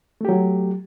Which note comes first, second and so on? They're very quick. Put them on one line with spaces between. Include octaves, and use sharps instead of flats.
A3 G4 F#3